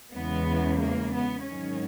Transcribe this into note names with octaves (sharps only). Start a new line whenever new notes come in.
E2 C#3 E3 G#3 B3
A#3
B3
G#2 D#3 F#3 C#4